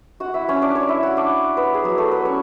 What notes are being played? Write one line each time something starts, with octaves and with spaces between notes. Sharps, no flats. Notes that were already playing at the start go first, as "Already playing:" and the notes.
F#4 F#5
E4 E5
C#4 C#5
D4 D5
C#4 C#5
E4 E5
F#4 F#5
D4 D5
B3 B4
G#4
F#3 F#4
A3 A4
B3 B4
C#4 C#5